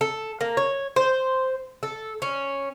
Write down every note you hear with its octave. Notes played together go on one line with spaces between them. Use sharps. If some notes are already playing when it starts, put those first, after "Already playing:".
A4
A#3
C#5
C5
A4
C#4